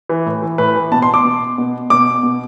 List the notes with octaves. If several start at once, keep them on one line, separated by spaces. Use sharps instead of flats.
E3
A2
E3
A2 B4
E3
B2 A5
C6
D6
B2
B2
B2 D6
B2